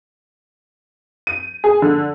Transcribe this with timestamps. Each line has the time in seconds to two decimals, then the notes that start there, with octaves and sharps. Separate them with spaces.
1.27 D#7
1.64 G#4
1.82 D3